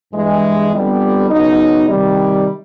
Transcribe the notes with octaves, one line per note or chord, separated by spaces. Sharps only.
G2 E3 G#3
F2 D3 G3 B3
C#3 F#3 B3 D#4
C3 D#3 G3